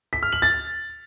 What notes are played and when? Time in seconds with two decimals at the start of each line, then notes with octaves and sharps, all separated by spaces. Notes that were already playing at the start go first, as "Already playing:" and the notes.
0.13 B6
0.23 F6
0.32 F#7
0.42 A6